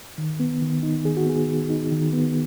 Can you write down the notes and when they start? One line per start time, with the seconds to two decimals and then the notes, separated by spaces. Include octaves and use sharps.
0.18 D#3
0.40 B3
0.62 D#3
0.83 D#4
1.04 D#3 G#4
1.17 F#4
1.26 B3 G#4
1.48 D#3
1.69 D#4
1.91 D#3
2.13 B3